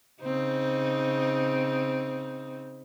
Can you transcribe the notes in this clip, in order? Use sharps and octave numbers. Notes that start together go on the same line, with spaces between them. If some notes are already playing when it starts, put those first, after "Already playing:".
C#3 C4 D#4